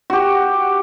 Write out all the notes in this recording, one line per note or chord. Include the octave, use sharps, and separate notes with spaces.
F#4 G4